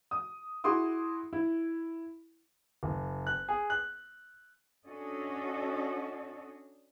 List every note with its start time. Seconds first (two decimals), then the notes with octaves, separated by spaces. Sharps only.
0.11 D#6
0.64 E4 F#4 G#4 C6 D6 D#6
1.33 E4
2.83 F#1
3.27 F#6
3.49 G#4
3.70 F#6
4.87 C#4 D4 F#4 A4 C#5 D#5